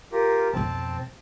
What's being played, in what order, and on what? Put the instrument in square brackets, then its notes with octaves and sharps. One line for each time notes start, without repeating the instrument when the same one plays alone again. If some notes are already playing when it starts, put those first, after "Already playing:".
[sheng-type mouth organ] F4 G4 A#4
[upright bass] B1 F2 [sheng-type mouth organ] C4 A5